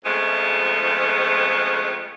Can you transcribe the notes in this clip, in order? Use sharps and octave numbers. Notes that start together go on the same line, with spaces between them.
F2 C#3 F3 G#3 A3 B3